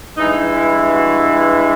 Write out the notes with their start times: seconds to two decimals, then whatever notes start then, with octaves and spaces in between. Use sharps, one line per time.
0.17 G2 E3 G#3 D#4
0.55 E4
0.93 F#4